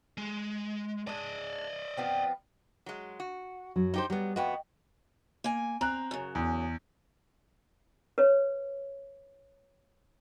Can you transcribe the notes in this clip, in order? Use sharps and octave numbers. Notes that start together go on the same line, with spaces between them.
G#3
G#3 D4 D5 D#5
F3 B3 C4
F#3 G#3
F#4
F#2 F#3
D#4 G4 C5
F#3 G3 B3
F2 B3 F#4 D#5 G5
A#3 G#5
C4 A#5 F#6
F#2 C#3
E2
B4 C#5